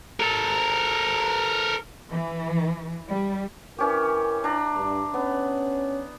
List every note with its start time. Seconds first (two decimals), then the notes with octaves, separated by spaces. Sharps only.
0.20 A4 A#4
2.09 E3
3.10 G3
3.78 E3 C#4 G4 A#4
4.44 D4 A#5
4.76 G2
5.14 B3 C#4